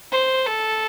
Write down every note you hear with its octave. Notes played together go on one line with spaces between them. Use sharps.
C5
A4